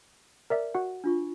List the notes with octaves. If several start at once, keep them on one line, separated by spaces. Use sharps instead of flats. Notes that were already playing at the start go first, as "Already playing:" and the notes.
A#4 D5 E5
F#4 F#5
D4 F4 C#6